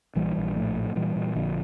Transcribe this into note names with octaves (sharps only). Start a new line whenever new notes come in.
A#1 E3 G3
A#1
A2 F3 A3
A2
A#2 E3 G3
A#2
A#1 D3 F3